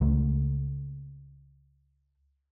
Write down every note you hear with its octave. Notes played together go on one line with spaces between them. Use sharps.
C#2 A3